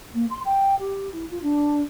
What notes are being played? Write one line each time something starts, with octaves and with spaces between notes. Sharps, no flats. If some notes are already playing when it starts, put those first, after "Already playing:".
A#3
C6
G5
G4
E4
F4
D4